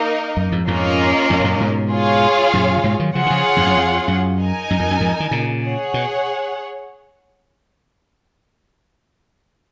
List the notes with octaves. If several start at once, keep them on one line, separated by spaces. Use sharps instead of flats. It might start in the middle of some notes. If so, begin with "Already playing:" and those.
Already playing: A#3 D#4 A#4 D#5
F#2
F2 G#2
F2 G#2 A#3 C#4 F4 A#4 D#5
F2 G#2
G#2
F#2 A#2
G#2 B2
F4 G#4 C#5 F5
F#2 A#2
C#3
G#2 B2
D#3 F#3
C#3 F3 F4 G#4 C#5 F#5
D#3
C#3 F3
F2 G#2
F#2
F2
F#2
D#4 A#4 D#5 G#5
F#2
F2
F#2
F2 G#2
D#3
A#2 C#3
G#4 C#5 F#5
B2